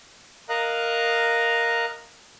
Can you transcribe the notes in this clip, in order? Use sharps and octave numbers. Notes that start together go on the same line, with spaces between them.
A#4 D#5 F5 A#5 F#6